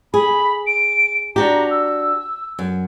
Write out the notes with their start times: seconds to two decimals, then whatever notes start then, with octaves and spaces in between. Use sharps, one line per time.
0.14 G#4 B5
0.67 D7
1.36 D4 F#4 G4 A#5
1.71 E6
2.59 F#2